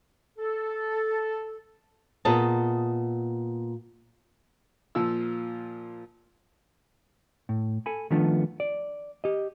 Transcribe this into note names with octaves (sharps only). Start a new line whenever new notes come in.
A4
A#2 B3 G#4 D#5 A5
A#2 F3 F4 E6
A2
A4 G#5 B5
D#3 F3 A3 B3 D4 F4
D5
G4 D#5